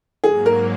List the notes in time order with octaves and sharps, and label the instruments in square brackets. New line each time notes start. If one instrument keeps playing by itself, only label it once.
[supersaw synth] G#2 F#3 A#3 [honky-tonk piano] G#4
[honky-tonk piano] A#4